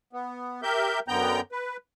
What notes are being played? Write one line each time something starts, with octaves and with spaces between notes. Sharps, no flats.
B3
G4 A#4 E5 G6
F#2 D3 B3 G5 A#5 G6
B4